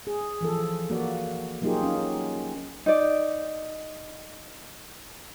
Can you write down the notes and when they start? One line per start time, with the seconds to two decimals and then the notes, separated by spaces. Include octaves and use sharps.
0.07 G#4
0.41 E3 F3 A4
0.90 A#3 F#4 D5
1.62 F#3 A#3 D#4 F4 G4 G#4
1.81 F#3 C#4 D#4
2.86 D#4 D5